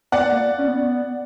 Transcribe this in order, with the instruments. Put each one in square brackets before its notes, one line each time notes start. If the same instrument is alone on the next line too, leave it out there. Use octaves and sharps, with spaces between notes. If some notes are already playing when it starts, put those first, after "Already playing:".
[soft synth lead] B3 [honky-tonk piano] D5 F#5
[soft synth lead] A#3
C#4
B3